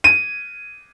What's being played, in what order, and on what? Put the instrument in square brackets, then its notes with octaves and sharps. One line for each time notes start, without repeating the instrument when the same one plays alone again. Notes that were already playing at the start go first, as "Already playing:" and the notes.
[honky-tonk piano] D#7